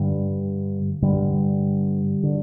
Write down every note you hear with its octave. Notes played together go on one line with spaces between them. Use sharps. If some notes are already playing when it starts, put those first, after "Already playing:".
Already playing: G2 D3 G3
G2 D3 G3
D3